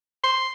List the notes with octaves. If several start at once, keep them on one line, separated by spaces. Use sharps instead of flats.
C6